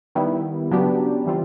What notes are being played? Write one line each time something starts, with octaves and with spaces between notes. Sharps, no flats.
D#3 G3 B3 E4
C#3 F#3 B3 D4 G4
E3 G3 C4 F4